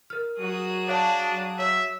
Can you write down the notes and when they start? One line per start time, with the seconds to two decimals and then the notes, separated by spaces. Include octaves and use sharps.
0.10 A#4 F6
0.39 F#3 F#4 G#4 D#6
0.88 D4 C#5 F5 A5
1.31 F#3
1.59 C#5 E5